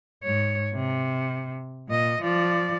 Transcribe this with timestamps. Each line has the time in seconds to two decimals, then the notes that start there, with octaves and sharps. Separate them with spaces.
0.24 G#2 C#5
0.74 C3
1.89 A#2 D#5
2.21 F3 D5